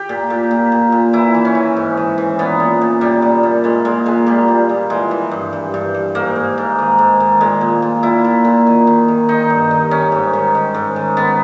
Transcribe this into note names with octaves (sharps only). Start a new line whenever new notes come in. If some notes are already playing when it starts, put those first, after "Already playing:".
Already playing: G4
A#2
A#2
A#2
A#2
A#2
E3 E4
E3
C#4
E3
G#2
E3
E3
A#2 B3
A#2
A#2
A#2 G3
A#2
A#2
A#2 G#3
A#2 G#3
A#2 G#3
A#2 G3
A#2
A#2
E3 G#3
E3
G2
G2
G2
G2
G#2 A#3
G#2
G#2
D#3
G#2
D#3
A#2 G#3
A#2
A#2
A#2 E4
A#2
A#2
D#3
D#3
D#3
D#3 D#4
G2
D#3
D#3 C#4
G#2
D#3
D#3
G#2
D#3
D#3 B3